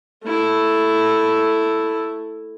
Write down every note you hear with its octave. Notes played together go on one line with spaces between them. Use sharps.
A3 E4